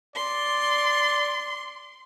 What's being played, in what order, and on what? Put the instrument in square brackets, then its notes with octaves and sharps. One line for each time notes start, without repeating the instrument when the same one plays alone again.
[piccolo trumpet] D5 [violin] C6